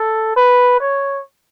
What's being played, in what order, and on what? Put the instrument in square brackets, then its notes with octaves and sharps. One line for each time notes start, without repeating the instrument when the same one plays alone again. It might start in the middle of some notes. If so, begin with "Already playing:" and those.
Already playing: [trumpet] A4
B4
C#5